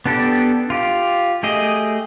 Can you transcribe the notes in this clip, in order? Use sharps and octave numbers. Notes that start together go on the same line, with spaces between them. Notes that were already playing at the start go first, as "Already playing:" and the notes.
B3 D4 G4 A4
F4 G4
A3 G4 G#4 D#5